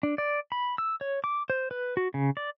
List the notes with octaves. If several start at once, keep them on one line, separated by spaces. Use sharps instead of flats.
D4
D5
B5
E6
C#5
D6
C5
B4
F#4
C#3
D5